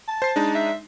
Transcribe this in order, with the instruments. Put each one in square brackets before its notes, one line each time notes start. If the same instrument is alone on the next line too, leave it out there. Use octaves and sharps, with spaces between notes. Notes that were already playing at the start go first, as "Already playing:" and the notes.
[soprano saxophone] A5
[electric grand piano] C5 C7
G#3 D4 D#4
[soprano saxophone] E5